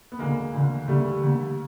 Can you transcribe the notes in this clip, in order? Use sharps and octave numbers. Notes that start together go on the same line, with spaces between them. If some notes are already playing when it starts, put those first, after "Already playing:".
B3
D2 D3 G#3 A#3
D2 D3
D#2 D3 G3 A3
D#2 D3